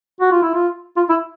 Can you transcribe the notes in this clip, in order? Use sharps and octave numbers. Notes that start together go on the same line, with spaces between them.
F#4
F4
E4
F4
F4
E4